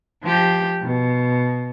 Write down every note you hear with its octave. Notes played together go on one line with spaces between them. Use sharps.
F3 G4
B2